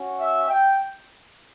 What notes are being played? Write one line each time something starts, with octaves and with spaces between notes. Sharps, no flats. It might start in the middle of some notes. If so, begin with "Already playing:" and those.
Already playing: C#4 F#4
E5
G5